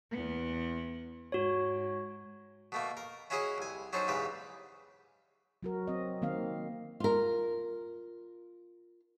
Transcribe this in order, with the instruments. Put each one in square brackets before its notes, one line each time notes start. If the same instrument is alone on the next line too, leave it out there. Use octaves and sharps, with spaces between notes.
[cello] E2 B3
[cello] G#2 [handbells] F#4 C#5
[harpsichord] B2 A3 A#3
A#4
C#4 E4 F#4 G#4 C#5 D#5
C2 G#5
F#3 C#4 D#4 A4 C5
E2 G#2 C#3 G4 B4
[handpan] F#3 F#4 A#4
C4 D#5
D#3 A#3 C4 F5
[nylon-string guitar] F4 A#4